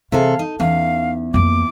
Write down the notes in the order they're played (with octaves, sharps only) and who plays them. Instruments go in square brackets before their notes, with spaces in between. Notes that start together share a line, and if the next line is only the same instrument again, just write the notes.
[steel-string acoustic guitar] C3 G#4 A4 [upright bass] E3 [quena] F5
[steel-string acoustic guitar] D#4
[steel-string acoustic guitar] E2 [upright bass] C#4 D#4 [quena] F5
[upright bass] F2 A#3 [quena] D6